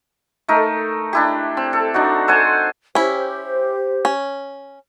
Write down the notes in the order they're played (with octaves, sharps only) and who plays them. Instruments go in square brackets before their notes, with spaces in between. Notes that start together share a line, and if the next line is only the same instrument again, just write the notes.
[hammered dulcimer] A3 D#4 A#4
D4 E4 G4
C4
A4
D4 D#4 F#4
A4 C5 F#5 G#5
[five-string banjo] C#4 E4 [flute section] G4 C5
[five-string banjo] C#4